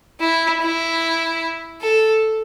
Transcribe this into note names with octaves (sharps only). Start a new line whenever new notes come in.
E4
E4
A4